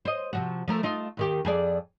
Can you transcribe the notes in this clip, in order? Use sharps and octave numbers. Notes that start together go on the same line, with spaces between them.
C5 D#5
C3 F3 F#4
F3 A3 A#4
A3 D#4 F4
D#2 D#3 G4
F2 G#4 D5